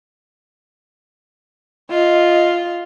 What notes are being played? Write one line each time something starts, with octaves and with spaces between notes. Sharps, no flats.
F4 D#5